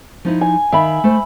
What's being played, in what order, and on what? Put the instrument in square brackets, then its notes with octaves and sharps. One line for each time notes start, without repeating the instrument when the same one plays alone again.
[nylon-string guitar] F3 D#4 E4
[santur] G#5
[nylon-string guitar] D#3 F5 [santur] E5 B5
[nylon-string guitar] A3 C5